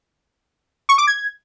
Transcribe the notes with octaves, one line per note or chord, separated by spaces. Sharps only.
C#6
D6
G#6